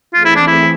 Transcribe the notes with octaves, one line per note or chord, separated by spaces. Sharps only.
E3 A3 C4 F4 G#4
E4
D4
E4